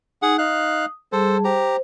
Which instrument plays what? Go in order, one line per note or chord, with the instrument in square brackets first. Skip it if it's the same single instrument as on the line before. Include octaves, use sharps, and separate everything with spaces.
[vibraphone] D#4 [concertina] G#4 F#5
[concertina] D#4 F5 F#6 [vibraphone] D#6
[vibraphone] G3 G#4 A5 [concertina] A4 C5
[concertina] G4 A#5 [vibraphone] C5